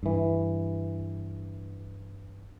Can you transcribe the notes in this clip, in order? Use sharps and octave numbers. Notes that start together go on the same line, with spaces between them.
G2 E3